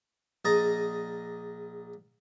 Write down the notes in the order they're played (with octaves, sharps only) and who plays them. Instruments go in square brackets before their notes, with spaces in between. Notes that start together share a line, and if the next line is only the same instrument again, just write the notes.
[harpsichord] A#1 G#4 D#5 A5 A#5